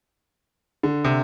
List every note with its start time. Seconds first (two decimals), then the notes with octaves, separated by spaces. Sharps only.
0.83 D3
1.04 C3